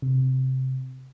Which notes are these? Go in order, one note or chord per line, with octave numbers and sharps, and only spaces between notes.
C3